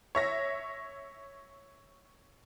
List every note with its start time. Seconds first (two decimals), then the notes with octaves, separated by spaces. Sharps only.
0.15 C#5 E5 A#6